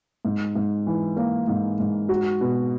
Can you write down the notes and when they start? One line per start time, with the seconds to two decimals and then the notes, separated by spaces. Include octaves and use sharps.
0.25 G#2
0.55 G#2
0.87 E3
1.17 A#3
1.48 G#2
1.79 G#2
2.09 F#4
2.41 B2